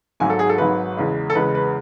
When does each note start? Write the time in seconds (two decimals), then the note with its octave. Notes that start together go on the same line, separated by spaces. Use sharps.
0.20 G#1 G#2 F#3 G#5
0.30 A4
0.39 G#4
0.49 A4
0.58 G#1 G#2 F#3 B4
0.97 E2 C#3 G#3
1.30 A4
1.35 E2 C#3 G#3 B4
1.55 B4